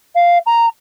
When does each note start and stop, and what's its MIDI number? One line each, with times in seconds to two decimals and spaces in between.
0.15 0.38 77
0.46 0.66 82